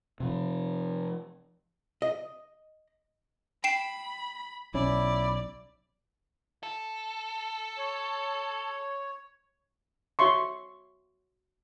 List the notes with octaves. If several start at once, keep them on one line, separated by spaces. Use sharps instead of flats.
C3 F3
D#5
G5 B5 C7 E7
B1 C#4 E4 D5
A4
C#5
F#4 C#5 E5 C6 C#6